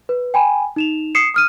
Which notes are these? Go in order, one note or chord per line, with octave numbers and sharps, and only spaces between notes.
B4
G5 G#5 B5
D#4 E7 F7
D#6 C7 C#7 E7
D#6 F6 D#7